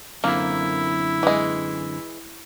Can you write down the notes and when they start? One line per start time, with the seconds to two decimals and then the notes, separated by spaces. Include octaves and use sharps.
0.24 F#2 D3 A#3 C4 E4
1.23 E3 G#3